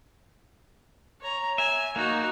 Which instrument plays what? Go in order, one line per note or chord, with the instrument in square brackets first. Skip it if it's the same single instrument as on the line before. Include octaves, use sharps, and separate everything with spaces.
[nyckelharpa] C#5 A#5
[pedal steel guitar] E5 [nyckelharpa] G#5
[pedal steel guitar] A#3 [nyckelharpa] D#4 F#4